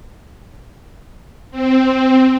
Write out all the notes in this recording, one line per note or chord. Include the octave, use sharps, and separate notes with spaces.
C4